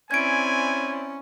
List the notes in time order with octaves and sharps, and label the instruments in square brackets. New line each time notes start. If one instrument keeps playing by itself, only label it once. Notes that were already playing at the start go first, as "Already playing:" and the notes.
[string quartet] C4 E4 D5 [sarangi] C#4 [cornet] G#5 [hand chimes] G#6 D7